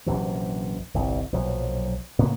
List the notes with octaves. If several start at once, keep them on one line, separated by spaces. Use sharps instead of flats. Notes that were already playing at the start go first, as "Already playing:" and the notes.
A#1 F#2 C3 E3
G1 C2
B1 A#2 F3 F#3
A2 C#3 A#3 B3